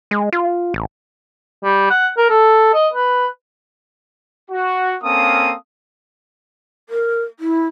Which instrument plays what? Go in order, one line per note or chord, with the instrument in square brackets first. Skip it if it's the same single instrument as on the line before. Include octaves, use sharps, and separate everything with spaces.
[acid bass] G#3
F4
A1
[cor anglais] G3
F#5
A#4
A4
D#5
B4
[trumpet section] F#4
A#3 C4 C#4 A4 F5 D#6
[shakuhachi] A#4
E4